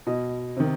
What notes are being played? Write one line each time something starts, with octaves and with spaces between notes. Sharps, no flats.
B2 D#5
C3 D#3